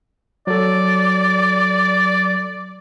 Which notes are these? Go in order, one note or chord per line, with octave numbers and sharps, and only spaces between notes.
F#3 A4 D5